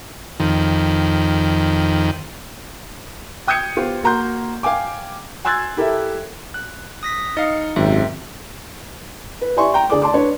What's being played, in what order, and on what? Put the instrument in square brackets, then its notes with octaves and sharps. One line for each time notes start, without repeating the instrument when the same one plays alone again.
[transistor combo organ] F2 D#3
[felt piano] G5 D#6 G6 G#6 C#7
B3 F4 G4 C5
A#3 F#4 A#5 C6 G6
F5 G5 G#5 D6
G#5 C6 E6 F#6 G#6 A6
E4 G4 A4 A#4 E5
[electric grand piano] F#6
[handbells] D#6 A#6 B6
[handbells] D#4 C#7 [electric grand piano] D#5 F5
[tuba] G#1 [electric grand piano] F#2 C3 [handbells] E5 G5
[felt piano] B4
G4 D5 E5 G#5 C6 C#6
G5 A#5
D3 G#4 D5 D6
D5 A5 C6 D6
D4 B4 C#5